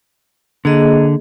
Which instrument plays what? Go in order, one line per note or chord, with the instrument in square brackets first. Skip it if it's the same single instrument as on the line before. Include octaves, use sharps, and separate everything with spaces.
[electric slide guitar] D3 [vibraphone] A#3 G#4 D#5